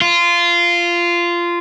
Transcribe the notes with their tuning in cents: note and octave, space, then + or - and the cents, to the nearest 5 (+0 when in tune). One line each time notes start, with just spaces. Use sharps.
F4 -15